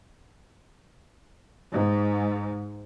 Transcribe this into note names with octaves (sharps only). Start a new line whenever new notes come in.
G#2